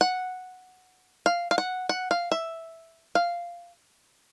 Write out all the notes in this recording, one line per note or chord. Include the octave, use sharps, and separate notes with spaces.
F#5
F5
F5
F#5
F#5
F5
E5
F5